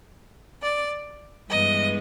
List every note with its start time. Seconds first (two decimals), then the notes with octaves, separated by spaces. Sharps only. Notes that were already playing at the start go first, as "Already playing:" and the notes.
0.61 D5
1.49 G2 E3 G#3 B3 D#5